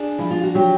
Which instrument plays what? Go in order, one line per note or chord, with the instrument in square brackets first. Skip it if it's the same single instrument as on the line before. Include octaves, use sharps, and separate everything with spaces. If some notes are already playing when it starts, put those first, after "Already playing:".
Already playing: [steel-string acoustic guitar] D4 G#4
F3 E4
F4
F#4
F#3 G4